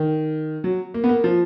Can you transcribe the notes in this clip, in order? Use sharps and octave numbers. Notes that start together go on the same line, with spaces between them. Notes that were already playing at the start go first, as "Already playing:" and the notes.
Already playing: D#3
F#3
A#3
B3
A#3
F3